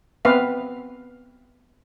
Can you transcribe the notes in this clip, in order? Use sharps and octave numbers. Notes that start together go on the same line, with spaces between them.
B3 C4 B4 E5 F5